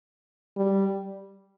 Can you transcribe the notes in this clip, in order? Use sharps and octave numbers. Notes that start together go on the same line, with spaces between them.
G3